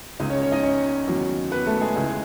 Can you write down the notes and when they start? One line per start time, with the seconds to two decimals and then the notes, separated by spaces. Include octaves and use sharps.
0.20 C#2 C#3 G#3 D#4 D#5
0.30 C#4 C#5
0.41 C#4 C#5
0.52 D#4 D#5
0.63 C#4 C#5
1.07 E2 D#3 F#3
1.52 B3 B4
1.67 A3 A4
1.81 G#3 G#4
1.96 C#2 C#3 E3 G#3 G#4